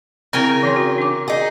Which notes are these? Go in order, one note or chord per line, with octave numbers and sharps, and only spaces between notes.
C#3 C4 E4 A#4 G5 G#5
E3 C#5 C6
F#4
D4 D6
D#4 G#4